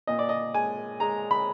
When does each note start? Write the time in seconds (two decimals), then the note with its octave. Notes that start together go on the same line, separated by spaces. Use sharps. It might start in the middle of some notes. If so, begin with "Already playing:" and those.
0.07 A#2 D#5
0.19 D5
0.29 D#5
0.54 G#3 G#5
1.00 G#3 A#5
1.31 B5